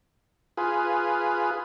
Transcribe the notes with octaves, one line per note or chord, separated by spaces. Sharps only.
F4 G#4 B4